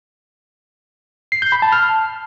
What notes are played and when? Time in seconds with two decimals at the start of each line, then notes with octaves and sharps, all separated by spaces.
1.32 C7
1.42 G6
1.52 B5
1.62 A5
1.72 F6